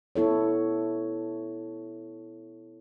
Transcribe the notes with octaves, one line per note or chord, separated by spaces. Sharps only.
B3 E4 A4 C#5